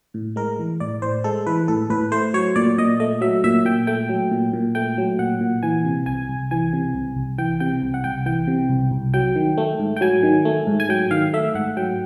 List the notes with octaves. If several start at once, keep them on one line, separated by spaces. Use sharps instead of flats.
A2
G#3 A#4
E3
A2 D5
A2 C5
G#3 A4
E3 B4
A2 A4
A2 B4
A3 C5
F#3 C#5
A#2 D5
A#2 D#5
A3 D#5
F#3 E5
A#2 E5
A#2 G5
A3 G5
F#3
A#2
A#2
A3 G5
F#3
A#2 F#5
A#2
E3 G#5
C3
C2 G#5
C2
E3 G#5
C3
C2
C2
E3 G5
C3 G5
C2
F#5
C2 G5
E3 G5
C3
C2
C2
F#3 G5
D#3
A3
G#2
G5
F#3 G#5
D#3
A3
G#2
G#5
F#3 G5
D#3 F5
A3 E5
G#2 F#5
F#3 G5